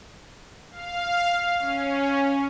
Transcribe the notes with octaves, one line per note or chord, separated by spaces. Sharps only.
F5
C#4